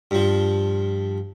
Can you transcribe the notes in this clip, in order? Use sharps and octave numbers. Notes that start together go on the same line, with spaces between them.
G2 F3